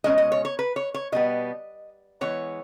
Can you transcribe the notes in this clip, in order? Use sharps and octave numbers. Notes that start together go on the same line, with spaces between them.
B2 G#3 C#4 D#5
D#5
C#5
C#5
B4
C#5
C#5
B2 G3 B3 D#5
E3 G#3 B3 C#5